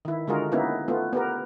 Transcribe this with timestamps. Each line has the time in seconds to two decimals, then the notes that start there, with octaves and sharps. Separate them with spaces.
0.05 D#3 E4
0.27 D3 G#3 F4 F#4 G#4 A#4
0.52 A#3 B3 C#4 D#4 E4
0.88 A3 B3 F4
1.13 B3 G4 A#4